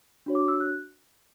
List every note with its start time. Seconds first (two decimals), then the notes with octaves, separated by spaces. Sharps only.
0.26 D4 F#4 C#5
0.35 D6
0.48 E6
0.60 F#6